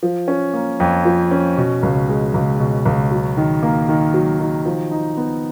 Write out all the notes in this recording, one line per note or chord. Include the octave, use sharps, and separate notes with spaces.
F3
C#4
A#3
F2
F3
C#4
B2
C#2
G#3
C#2
B2
C#2
F#3
D#3
A#3
D#3
F#3
D#3
F3
D#4
B3